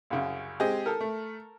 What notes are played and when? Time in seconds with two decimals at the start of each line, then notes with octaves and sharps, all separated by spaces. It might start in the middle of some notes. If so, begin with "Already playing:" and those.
0.10 C2 F#2 C#3
0.60 G#3 C4 G4 G#4 D#5
0.86 A4 A#4
1.01 A3